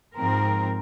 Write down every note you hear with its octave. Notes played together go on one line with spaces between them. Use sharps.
G#2 F3 C4 A#4